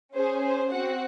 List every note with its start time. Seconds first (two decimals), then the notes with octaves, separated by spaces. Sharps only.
0.14 C#4 G#4 C5
0.44 C5
0.71 C4 F#4 F#5